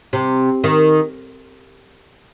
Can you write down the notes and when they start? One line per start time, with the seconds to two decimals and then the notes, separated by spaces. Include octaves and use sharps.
0.13 C3
0.64 D#3